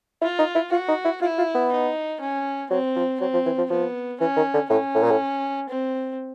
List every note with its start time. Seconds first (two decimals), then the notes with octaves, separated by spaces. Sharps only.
0.22 E4 F4
0.39 D#4
0.55 E4
0.72 F4 F#4
0.89 D#4
1.05 E4
1.21 E4 F4
1.38 F4
1.55 B3
1.72 D#4
2.21 C#4
2.70 F#3 C4
2.96 F3
3.20 F#3 C4
3.34 F3
3.46 E3
3.58 F3
3.70 F3 B3
4.20 E3 C#4
4.37 D#3
4.54 D3
4.70 A2 C#4
4.95 A2
5.03 A#2
5.11 A2
5.69 C4